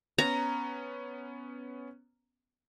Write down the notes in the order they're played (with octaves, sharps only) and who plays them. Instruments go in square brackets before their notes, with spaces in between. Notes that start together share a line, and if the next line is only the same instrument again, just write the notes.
[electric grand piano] B3 C#4 [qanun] A#5